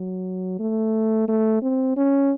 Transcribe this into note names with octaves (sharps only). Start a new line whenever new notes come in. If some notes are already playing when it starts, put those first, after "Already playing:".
Already playing: F#3
A3
A3
C4
C#4